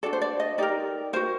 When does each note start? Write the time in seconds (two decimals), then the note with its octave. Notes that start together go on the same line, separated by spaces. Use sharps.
0.03 D4 F#4 A4 D5
0.13 C5
0.21 D5
0.40 D#5
0.58 D#4 G4 A#4 D5
1.13 F#4 A#4 C5